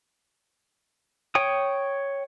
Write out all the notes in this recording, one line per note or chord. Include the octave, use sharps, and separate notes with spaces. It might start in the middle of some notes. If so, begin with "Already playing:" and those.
C#5 G5 D#6